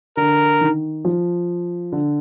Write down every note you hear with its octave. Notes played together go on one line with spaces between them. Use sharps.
D3 A#4
D#3
F3
D3